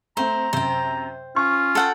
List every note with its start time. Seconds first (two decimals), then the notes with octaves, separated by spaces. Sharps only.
0.17 A3 C4 C5 A#5
0.53 F#2 C3 C5 G5
1.36 C#4 F4 C#6
1.75 A4 F#5 G5